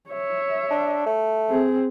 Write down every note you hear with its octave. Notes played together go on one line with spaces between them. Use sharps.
C#5 E5
D4
A3
C4 G#4